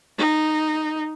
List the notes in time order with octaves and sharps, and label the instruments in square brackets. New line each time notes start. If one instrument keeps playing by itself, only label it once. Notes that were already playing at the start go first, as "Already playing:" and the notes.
[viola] D#4